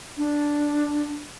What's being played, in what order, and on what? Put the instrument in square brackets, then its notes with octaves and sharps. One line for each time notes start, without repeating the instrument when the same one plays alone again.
[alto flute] D4